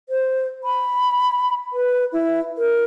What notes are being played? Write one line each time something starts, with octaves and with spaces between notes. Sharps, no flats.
C5
B5
B4
E4
A#4